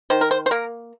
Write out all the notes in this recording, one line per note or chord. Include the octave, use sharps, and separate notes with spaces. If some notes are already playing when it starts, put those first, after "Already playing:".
D#3 C5
A#4
C5
C5
A#3 A#4